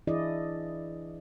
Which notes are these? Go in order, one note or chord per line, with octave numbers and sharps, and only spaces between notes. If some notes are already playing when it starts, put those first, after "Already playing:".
E3 D4 E4 G#4 D5 D#5